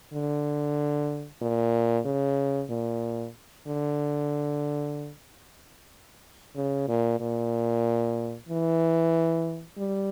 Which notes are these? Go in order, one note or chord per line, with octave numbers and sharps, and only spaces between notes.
D3
A#2
C#3
A#2
D3
C#3
A#2
A#2
E3
G3